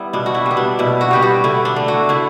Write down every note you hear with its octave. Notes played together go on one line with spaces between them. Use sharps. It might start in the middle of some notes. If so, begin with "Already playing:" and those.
Already playing: G3 B3 E4
B2 D4
F#4
E4
G3
B3
D4
B2 E4
F#4
G3 B3 G4
F#4
D3 E4
D4
A3
F#4
D3 E4